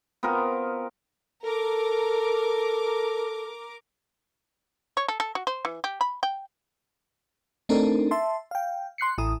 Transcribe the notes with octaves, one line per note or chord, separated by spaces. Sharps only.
B3 C4 F4 A#4
A4 A#4 D6
C#5
A4
A4
F#4
C5
E3
G4
B5
G5
A3 C4 D4 D#4 A4 A#4
E5 A5 C6
F5 G5
C6 F#6 C7 C#7
A1 E4 D#6